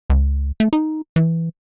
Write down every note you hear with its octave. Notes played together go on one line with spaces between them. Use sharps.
C#2
A3
D#4
E3